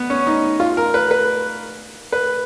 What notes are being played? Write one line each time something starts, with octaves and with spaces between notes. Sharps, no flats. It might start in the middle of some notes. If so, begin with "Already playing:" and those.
Already playing: B3
C#4
D#4
F4
A#4
B4
B4
B4